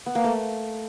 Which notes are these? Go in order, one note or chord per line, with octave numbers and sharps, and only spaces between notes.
B3
A#3
A3